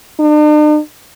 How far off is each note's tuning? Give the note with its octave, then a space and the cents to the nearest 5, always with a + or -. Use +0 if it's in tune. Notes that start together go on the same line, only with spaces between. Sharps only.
D4 +45